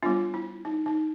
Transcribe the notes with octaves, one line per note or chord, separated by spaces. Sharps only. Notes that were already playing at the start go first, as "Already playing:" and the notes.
G3 B3 D4 F4
E4
D#4
D#4